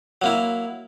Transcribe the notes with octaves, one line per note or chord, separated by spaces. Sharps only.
F#3 A#3 E4